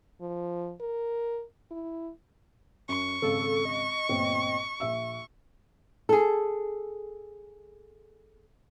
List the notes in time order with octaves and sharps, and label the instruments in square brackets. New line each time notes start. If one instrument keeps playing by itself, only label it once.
[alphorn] F3
A#4
E4
[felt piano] F#2 [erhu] C#6
[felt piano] G#1 C#3 F5 [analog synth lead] A4
[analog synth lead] D#5
[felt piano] G1 A#2 C4
A#1 E5 E6
[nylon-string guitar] G#4 A4